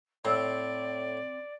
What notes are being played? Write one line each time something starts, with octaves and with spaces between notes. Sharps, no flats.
A2 C4 D5